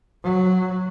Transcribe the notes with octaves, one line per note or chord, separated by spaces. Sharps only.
F#3